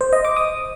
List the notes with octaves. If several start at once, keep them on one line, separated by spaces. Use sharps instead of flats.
C5
D#5
D6
D#6